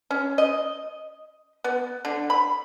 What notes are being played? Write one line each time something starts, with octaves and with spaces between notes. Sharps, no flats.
C#4
D#5
B3
D3
B5